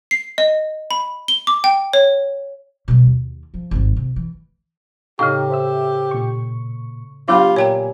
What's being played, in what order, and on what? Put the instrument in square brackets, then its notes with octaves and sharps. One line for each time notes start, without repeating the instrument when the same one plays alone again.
[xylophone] C7
D#5
B5
G7
D6
G5
C#5
[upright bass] B2 G3
D#2
F3
G#1 G2
C3
E3
[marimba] A2 C#3 [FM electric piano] D#4 G5 A#5 [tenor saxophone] G4 [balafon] F5
[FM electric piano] C5 E5 E6
A#2 C#6
[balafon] F#3 B3 [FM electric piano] D4 G5 [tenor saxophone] F4 [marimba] G4 B5 D6
[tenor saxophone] A#2 [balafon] C#5 G5 A#5 [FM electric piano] G#5